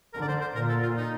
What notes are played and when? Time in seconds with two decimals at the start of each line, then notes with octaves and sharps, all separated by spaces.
0.13 D3 A#4
0.22 D5
0.28 C5
0.41 C5
0.55 A#2 A#4
0.69 A4
0.82 F4
0.97 D#4